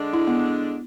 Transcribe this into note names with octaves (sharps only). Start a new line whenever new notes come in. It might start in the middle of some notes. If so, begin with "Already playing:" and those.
Already playing: D3 G#3 D4
E4
B3